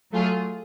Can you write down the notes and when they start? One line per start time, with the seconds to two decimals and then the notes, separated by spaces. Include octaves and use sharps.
0.11 F#3 A3 F4 G#4